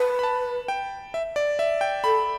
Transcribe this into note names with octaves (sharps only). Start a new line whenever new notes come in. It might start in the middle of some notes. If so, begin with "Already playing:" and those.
Already playing: B4 A5
B5
A5
G5
E5
D5
E5
G5
A4 B5